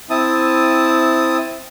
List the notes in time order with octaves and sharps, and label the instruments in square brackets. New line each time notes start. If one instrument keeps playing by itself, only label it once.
[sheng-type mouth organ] C4 E4 A5 D#6